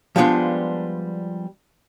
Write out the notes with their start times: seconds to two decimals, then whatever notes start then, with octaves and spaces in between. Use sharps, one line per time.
0.16 F3 G3 G#3 B3 D4 F4